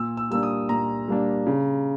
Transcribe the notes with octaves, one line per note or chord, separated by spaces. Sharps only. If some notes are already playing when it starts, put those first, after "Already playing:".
Already playing: A#2 E6
E6
G3 A#3 D4 E6
D#6
A#2 A#5
G3 A#3 D4
C#3